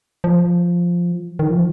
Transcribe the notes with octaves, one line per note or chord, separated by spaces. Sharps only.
F3
D#3
F3